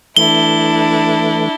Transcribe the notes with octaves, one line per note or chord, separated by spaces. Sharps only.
E3 A3 D4 E4 G7